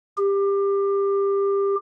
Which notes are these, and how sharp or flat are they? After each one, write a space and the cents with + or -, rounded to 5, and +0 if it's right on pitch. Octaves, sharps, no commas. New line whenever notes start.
G4 +20